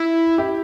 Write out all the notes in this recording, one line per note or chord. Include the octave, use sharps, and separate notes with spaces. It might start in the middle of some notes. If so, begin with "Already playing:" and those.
Already playing: E4
E4 G4